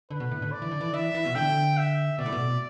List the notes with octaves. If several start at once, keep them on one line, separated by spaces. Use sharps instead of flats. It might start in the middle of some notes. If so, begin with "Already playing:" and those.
D3 B4
B2
A2
D3
D5
E3
D3
E3
E3 E5
E3
B2
D3 G5
E5
B2 D5
A2
B2